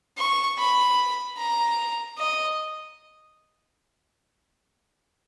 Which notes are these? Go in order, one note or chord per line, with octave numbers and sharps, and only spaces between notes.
C#6
B5
A#5
D#5